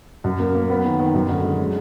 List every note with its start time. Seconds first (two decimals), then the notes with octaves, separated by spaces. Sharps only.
0.24 F#2
0.39 A#3
0.55 A#3
0.70 B3
0.85 D#3
1.00 D#3
1.14 F#2
1.29 D3
1.44 G#3
1.60 G#3